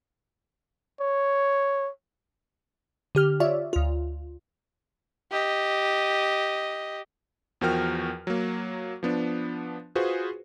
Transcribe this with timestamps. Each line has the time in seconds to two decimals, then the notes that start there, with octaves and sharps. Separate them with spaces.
1.01 C#5
3.15 D3 G4 F6
3.40 F4 C#5 D5 E5
3.73 D2 F4
5.31 G4 D#5
7.61 E2 F3 F#4 A#4 G5 F6
8.27 F#3 A#3
9.03 F3 B3 D4
9.95 F4 F#4 G#4 B4 C5